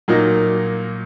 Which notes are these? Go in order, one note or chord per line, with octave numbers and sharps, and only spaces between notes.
A#2 F#3 A#3 D#4